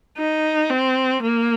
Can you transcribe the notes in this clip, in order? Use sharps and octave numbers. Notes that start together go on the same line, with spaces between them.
D#4
C4
A#3